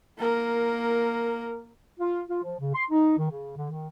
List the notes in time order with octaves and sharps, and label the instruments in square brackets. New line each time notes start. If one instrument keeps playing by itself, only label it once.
[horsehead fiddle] A#3 A#4
[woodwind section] F4
F4
F3
C#3
C6
D#4
D#3
C#3
D3
D#3